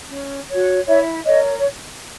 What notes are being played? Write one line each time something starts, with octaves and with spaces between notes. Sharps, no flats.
C#4
F#4 C#5
E4 C#5 E5
A#4 C#5 D#5
C#5